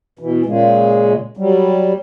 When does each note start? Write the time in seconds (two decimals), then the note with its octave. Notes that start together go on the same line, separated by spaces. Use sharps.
0.19 B2 E3
0.46 A#2 C#3 G#3
1.37 F#3 G3